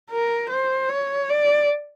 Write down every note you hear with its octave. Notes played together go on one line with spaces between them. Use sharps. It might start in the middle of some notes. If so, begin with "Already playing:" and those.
A#4
C5
C#5
D5